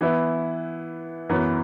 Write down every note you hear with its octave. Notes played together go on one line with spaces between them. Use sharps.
E3 B3 E4
F#2 E3 B3